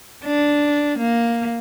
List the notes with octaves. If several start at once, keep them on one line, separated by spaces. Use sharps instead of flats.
D4
A#3